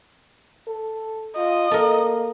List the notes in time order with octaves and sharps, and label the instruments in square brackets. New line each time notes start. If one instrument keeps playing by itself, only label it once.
[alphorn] A4
[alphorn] F4 [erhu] D#5
[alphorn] A#3 [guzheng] A4 A#4